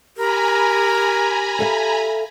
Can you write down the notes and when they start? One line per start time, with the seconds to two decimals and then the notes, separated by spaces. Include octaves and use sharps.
0.17 G4 A#4 G#5 A#5 B5
1.59 A4 E5 F5